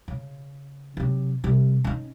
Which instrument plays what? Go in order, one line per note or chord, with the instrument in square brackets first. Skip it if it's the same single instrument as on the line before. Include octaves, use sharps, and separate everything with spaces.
[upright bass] C#3
C3 F#3
C3 G3
C#4 D#4